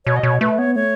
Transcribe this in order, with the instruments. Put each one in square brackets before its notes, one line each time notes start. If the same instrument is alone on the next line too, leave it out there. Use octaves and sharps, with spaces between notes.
[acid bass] B2 [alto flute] C#5
[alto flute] D#5
[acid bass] B2 [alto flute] C#5
[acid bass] A3 [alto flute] B4
[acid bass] B3 [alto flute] C#5
[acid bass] A3 [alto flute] C#5